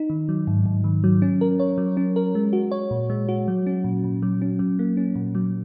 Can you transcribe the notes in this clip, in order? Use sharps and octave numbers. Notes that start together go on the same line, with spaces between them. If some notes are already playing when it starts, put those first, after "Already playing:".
Already playing: D#4
D#3
F#3
G#2
G#2
D#3
F#3
C#4
A#4
C#5
F#3
C#4
A#4
G#3
F#4
C#5
A#2
G#3
F#4
F#3
C#4
A#2
A#2
F#3
C#4
F#3
A#3
C#4
A#2
F#3